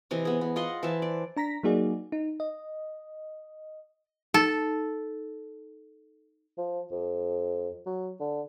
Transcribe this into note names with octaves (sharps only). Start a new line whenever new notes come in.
C3 E3 D#5
B3 G#4
B3
F4 D#5 F#5 C6
E3 C5 E5 A5
D5
D4 A#5 A#6 B6
F#3 A#3 D#4 F#4 G#4 D5
D#4
D#5
D#4 A4
F3
F2
F#3
D3